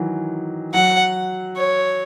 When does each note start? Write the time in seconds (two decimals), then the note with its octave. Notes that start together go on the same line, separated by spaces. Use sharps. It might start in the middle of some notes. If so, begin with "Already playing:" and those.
Already playing: D#3 E3 F#3
0.74 F#3 F#5
1.57 C#5